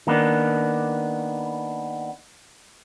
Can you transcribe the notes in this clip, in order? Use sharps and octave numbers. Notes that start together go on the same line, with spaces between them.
D#3 A#3 B3 D4